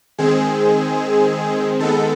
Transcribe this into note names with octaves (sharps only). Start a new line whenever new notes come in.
D#3 G#3 C4 G#4
D#3 G#3 B3 A4